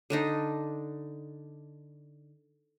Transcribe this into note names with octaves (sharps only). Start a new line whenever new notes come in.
D3 D4 D#4